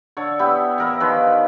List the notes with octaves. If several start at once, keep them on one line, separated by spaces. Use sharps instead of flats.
D3 C#5
B3 E4 G4
E3 A#4 E5
D#3 F3 B4 C#5